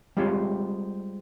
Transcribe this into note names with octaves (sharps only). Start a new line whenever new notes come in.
G3 G#3 C4 F4 C#5